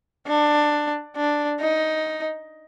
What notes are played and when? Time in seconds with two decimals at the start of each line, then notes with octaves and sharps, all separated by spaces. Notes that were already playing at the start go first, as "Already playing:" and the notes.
0.27 D4
1.16 D4
1.61 D#4